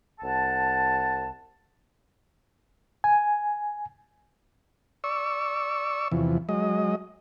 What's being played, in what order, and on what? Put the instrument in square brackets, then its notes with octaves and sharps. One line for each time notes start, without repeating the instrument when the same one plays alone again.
[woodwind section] C2 F#5 A5
[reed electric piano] G#5
[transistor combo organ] D5 C#6 E6
E2 C3 E3 F3
F#3 G#3 D#5